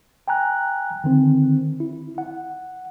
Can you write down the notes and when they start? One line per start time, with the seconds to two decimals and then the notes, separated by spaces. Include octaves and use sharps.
0.28 G5 G#5 A#5 F#6
1.04 D3 D#3 C4
1.80 E4
2.18 F#5